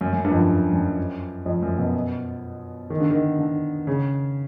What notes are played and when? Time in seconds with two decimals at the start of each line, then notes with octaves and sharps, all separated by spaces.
0.01 F#2
0.13 F#2
0.24 G2
0.31 F2
0.37 F#2
0.49 G2
0.73 F#2
1.46 F2
1.62 F#2
1.79 B2
2.90 D#3
3.00 D3
3.11 D#3
3.39 D3
3.87 C#3